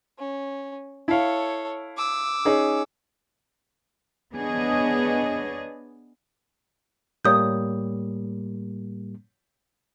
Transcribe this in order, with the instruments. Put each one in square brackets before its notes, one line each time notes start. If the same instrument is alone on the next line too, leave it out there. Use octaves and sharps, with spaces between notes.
[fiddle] C#4
[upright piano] E4 F5 [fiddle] A4 C#5
[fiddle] D6 E6
[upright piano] C#4 D#4 G#4
[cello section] B3 D4 G#4 C#5 D#5
[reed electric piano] A2 G3 A#3 [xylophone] C#5 D#6 G6